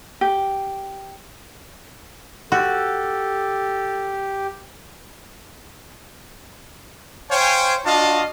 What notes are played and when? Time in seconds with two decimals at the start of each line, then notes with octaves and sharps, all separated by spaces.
0.21 G4
2.52 F#4 G4 A4
7.31 C5 C#5 F5 G5 G#5
7.85 D4 F4 F#4 D#5 F5 A5